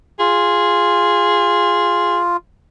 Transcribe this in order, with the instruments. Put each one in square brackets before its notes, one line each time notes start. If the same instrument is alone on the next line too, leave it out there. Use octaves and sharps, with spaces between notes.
[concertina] F4 [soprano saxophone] G#4